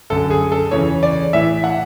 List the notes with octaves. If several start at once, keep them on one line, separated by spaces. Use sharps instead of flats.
F#2 D3 A4
G#4
A4
E2 C#3 E3 C#5
D5
A2 E3 E5
F#5